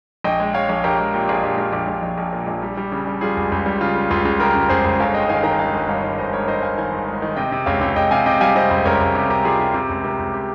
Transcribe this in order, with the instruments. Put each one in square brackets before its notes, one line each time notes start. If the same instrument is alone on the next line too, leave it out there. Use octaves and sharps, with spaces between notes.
[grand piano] A#1 D#5 G5
G#3
G#3 C#5 F5
A#1
A#1 G4 A#4
G#3 G4
A#2 G4
A#1 F4 G#4
A#1 G4
A#1
A#1 G4
A#1
A#1
A#1
A#2
A#1
G3
G3
C#3
G3
G3 F4 G#4
C#2
C#2
G3
C#3 F4
C#3
C#2 F4 G#4
C#2
C#3 G4 A#4
C#2
C#2 G#4 C5
C#2
G1 C#5 F5
G#3 D#5 G5
D#3 F5 G#5
D#3 G5 A#5
G1 F5 G#5
G1
G2 C#5 F5
D#3
G1 C5 D#5
G#3 A#4 C#5
D#3 C5 D#5
G1 F5 G#5
D#3 F5 G#5
G1
G#3
D#3
C3 D#5 G5
C3
C#2 C#5 F5
C#2
C#2 D#5 G5
C3 F5 G#5
C3 D#5 G5
G3 F5 G#5
C3 C5 D#5
C#2
C#2 A#4 C#5
C#2
C3 G4
C#2 G4 A#4
G3 F4 G#4
C3 G4
C3 G4
C#2
C3 G4 A#4
C#2
G4